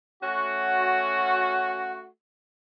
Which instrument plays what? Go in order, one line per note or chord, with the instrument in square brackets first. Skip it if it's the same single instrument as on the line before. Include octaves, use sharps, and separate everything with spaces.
[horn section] A3 C#4 F#4